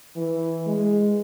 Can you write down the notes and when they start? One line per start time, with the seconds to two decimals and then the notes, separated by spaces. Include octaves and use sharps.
0.16 E3
0.66 G#3